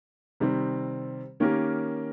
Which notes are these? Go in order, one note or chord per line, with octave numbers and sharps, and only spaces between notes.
C3 D#3 G3 C4
D#3 A#3 C#4 G4 A#4